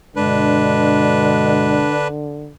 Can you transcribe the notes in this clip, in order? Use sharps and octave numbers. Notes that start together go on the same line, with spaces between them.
G2 B2 D3 G#3 D4 B4